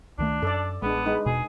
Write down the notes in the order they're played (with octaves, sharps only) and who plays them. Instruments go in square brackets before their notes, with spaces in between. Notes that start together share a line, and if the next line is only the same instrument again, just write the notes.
[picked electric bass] C#2 D#3 A3 [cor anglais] D4
[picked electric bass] F#2 [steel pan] A4 D5
[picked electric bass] A1 [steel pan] G#3 D4 [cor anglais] B3
[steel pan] G#3 D#4 B4
[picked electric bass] E1 B2 [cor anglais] G#4